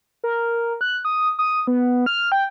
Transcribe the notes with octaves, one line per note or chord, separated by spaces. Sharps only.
A#4
F#6
D#6
D#6
B3
F6
G5